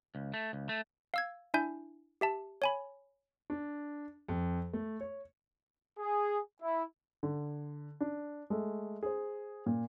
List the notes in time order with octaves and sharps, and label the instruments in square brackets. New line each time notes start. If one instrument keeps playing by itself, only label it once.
[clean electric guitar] C#2
A3
C#2
A3
[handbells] F5 E6 G#6
D4 E4 E5 G#5 G6
G4 E5 A5
C#5 G#5 B5
[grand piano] D4
F2
A3
C#5
[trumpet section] G#4
E4
[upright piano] D3
D4
G#3 A3
G#4 C5
A#2